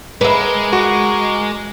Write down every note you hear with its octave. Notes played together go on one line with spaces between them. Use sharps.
G#3 A#4 B4 E5 D6
F#4